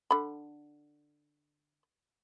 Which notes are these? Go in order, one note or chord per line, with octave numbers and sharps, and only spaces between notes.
D3 B5